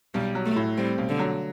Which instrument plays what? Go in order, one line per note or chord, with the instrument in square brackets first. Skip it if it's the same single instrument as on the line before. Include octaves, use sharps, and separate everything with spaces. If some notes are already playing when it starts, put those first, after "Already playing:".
[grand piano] B1 [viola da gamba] G3
[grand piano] F#3
[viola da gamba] A3
[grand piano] A2
[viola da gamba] G3 [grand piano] C4
[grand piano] B1
[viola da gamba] D3
[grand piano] F#3